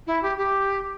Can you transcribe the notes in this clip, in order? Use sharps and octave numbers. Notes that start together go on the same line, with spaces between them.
E4
G4
G4